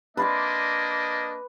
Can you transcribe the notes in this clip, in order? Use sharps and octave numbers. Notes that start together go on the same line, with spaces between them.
A#3 D4 B4 D#5 C6 D6